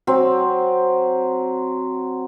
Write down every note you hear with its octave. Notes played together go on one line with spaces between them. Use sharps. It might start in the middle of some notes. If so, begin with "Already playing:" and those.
F#3 C4